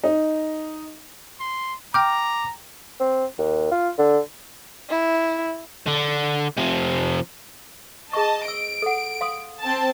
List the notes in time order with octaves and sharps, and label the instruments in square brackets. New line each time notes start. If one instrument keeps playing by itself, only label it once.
[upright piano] D#4
[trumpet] C6
[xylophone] G5 F6 G6 [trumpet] A#5 [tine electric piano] D6
[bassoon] C4
D#2
F4
D3
[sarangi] E4
[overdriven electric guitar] D3
C3 F3
[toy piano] G#4 C#6 [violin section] D#5 A5
[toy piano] E6 [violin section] D7
[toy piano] A4 F#5
F5 C6 D#6
[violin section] C4 A5